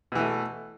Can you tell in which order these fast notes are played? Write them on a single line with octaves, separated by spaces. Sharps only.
B2 E3 A3